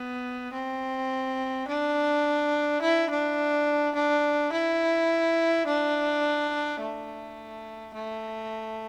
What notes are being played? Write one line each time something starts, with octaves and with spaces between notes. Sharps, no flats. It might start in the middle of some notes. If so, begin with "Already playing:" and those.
Already playing: B3
C4
D4
E4
D4
D4
E4
D4
A3
A3